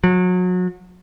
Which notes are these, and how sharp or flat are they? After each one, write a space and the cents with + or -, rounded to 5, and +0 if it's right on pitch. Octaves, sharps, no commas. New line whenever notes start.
F#3 -30